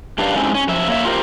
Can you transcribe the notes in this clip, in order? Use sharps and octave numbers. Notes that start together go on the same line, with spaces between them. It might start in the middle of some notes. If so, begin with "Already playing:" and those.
F#2 D4 G4 B4 D5 F5
G#3 C4 C#4 D#4 E4 G4
C#4
F#2 F3 E5
A#3 C#5 E5
F4 G4 A#4 C5